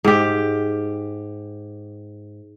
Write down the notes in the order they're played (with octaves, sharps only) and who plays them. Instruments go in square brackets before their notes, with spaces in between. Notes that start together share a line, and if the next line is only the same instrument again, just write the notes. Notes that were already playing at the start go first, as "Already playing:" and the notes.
[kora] G#2 G4